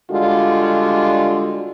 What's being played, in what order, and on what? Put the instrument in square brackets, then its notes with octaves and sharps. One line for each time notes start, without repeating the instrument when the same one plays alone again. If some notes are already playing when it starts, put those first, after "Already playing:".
[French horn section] D3 G3 G#3 F4 F#4